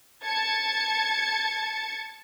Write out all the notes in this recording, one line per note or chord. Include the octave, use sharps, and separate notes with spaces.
A5 G#6 A6 C#7